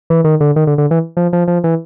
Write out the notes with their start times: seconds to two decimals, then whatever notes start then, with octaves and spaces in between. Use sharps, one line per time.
0.10 E3
0.24 D#3
0.40 D3
0.56 D#3
0.67 D3
0.78 D3
0.91 E3
1.17 F3
1.33 F3
1.48 F3
1.64 E3